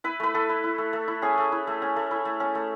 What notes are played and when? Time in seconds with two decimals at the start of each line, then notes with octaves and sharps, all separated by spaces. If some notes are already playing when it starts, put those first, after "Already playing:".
0.04 E4 B4
0.20 A3 B4
0.34 A3 A4
0.49 E4
0.64 E4
0.78 A3
0.93 A3
1.08 E4
1.22 C#4 G#4
1.38 A3
1.52 E4
1.67 A3
1.82 C#4
1.96 A3
2.11 E4
2.25 A3
2.40 C#4
2.55 A3